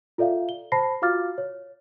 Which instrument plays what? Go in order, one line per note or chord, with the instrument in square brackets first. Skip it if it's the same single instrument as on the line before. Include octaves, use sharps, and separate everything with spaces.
[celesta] F4 A4 D5 E5 F5
G7
C5 A5 B5 A#6 C7
F4 F#4 F5 D6 F6 A6
C#5